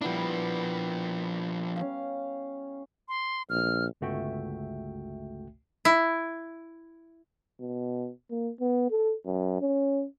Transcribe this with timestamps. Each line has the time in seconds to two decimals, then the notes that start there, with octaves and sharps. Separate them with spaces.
0.01 F3 G3 B3 D4 E4
1.76 C#4 F5
3.08 C6
3.50 A#1 F6
4.01 G1 C#2 A3 F#4 E5 G5
5.85 E4
7.60 B2
8.31 A#3
8.61 B3
8.90 A4
9.26 F#2
9.61 C#4